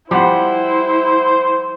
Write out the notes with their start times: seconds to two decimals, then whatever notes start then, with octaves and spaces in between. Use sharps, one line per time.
0.11 F3 G3 E4 C5 F#5 D6